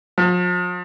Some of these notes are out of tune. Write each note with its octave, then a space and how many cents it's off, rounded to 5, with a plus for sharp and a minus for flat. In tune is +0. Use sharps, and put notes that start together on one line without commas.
F3 +45